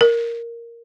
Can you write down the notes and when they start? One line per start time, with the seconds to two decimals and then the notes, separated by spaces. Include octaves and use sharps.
0.01 A#4